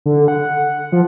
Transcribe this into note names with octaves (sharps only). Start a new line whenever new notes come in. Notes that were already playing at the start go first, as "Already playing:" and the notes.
D3
F#5
F3